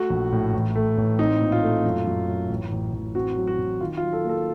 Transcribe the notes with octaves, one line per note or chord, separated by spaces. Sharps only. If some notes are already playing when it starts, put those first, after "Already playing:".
Already playing: A3 F#4
A#1
A2
A1
A3
A1
C4 D#4
A#2
F4
A3
F#2
F#2
F#2
A1
A1
A1
C4 F#4
F#3
F#4
A1
D#3 F4
F4
F#3
A4
A#3 A4